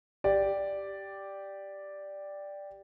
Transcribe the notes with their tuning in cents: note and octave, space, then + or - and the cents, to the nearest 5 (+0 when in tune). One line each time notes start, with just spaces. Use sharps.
G4 +0 D5 +0